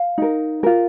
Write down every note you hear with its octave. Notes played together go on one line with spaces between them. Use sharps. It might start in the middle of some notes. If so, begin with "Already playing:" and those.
Already playing: F5
D#4 A#4
F4 A#4